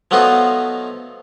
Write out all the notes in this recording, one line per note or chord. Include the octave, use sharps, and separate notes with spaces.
F3 F#3 A3 B3 D#4 F4